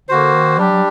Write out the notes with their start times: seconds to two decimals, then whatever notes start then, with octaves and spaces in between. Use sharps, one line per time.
0.09 D3 A#3 F#4 C5
0.33 D#3
0.57 F#3 G3 D4 G4
0.72 F#3